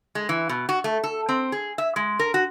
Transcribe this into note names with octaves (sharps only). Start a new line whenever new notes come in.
G#3
E3
B2
F#4
A3
A4
C4
G#4
E5
G#3
A#4
F#4